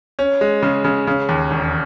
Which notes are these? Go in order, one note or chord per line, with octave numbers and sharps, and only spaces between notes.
C#4
G#3
C#3
C#3
C#3
D#2
E1